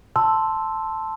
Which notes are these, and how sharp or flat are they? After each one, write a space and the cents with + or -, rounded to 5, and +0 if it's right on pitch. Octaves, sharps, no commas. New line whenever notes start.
A5 +0 C6 +0 E6 +0